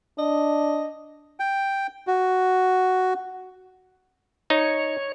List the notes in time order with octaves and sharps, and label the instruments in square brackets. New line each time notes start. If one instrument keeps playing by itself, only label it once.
[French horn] D4 [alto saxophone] D#5
[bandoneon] G5
F#4
[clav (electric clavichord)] D#4 [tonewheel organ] C#5